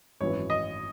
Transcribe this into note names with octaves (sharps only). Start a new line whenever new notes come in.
G#1 F#2 E3 C#5
D#5